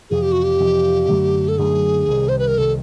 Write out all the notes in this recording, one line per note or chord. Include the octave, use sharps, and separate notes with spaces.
F2 C3 E3 G#4
G4
F#4
G4
F2 C3 E3
F#2 D3 F#3 A3
A4
F#2 D3 F#3 A3 G#4
C2 C3 D#3
C5
B4
A#4
C2 C3 D#3 A4